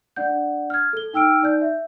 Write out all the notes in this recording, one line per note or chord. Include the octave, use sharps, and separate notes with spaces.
D4 D5 F#5 G6
F6 G#6
A4 G7
D#4 G5 E6 F6 D7
D#4 D5 G6
E5